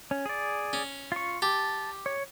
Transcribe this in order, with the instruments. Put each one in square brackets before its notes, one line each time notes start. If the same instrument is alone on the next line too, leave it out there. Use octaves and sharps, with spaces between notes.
[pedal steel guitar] C#4
G#4 D5
[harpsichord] C#4
[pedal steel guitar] F4 C#6
[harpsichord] G4 [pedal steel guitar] A5
[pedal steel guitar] C#5